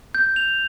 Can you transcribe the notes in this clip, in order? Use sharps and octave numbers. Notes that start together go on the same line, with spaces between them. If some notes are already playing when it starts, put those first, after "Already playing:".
G6
F7